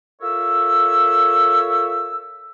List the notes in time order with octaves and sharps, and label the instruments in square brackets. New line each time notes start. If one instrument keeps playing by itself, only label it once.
[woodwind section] F4 A4 A#4 C#5 E5 E6